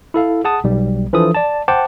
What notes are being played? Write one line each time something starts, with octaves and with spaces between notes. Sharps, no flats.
E4 A4 F5
G#4 F#5 A5 D#6
B1 G3
E3 F3 D4 A4 D#6
D5 A5
C5 F#5 G5 A5 D6